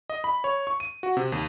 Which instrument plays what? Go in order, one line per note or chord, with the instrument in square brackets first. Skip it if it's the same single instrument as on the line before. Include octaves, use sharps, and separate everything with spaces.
[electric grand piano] D#5
B5
C#5
C#6
D#7
F#4
C3
D#2